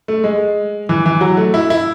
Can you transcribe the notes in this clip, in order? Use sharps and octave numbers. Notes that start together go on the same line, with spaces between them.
A3
G#3
E3
E3
F#3
A3
E4
E4